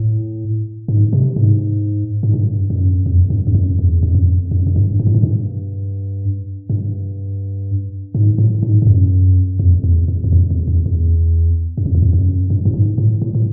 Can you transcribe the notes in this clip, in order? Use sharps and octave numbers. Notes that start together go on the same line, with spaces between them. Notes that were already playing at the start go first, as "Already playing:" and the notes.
Already playing: A2
G#2
C3
G#2
G#2
G2
F#2
F2
G2
F2
F#2
E2
F#2
F2
F#2
F#2
G2
G#2
A2
G#2
G2
G2
G#2
A2
G#2
G2
F#2
F2
E2
E2
E2
F2
E2
E2
E2
F#2
F2
E2
F2
F#2
G2
A2
G#2
A2
A2
A2